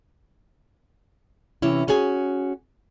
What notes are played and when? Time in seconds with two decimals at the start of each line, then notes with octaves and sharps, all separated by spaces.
1.62 C3 E3 C#4 E4
1.88 C#4 F#4 G#4 G#5